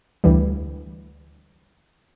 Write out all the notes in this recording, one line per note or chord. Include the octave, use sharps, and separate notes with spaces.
D2 E3 G3